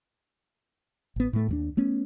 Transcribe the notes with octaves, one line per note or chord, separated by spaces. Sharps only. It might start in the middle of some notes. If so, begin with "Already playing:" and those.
A1 B3
A2 A3
D#2 G3 D4
A3 B3 C#4